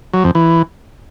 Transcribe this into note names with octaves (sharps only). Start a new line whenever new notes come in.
F#3
F2
E3